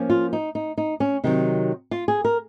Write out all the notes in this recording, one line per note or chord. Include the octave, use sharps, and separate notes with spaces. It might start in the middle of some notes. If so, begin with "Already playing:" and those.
Already playing: F3 A#3 C#4
F4
D#4
D#4
D#4
C#4
C3 D#3 F#3 D#4
F4
G#4
A#4